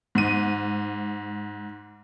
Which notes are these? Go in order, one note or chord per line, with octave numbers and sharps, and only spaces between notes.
G#2 D#7